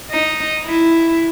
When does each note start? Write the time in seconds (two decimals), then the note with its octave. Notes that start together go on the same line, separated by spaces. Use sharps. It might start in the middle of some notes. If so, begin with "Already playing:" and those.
0.11 D#4
0.65 E4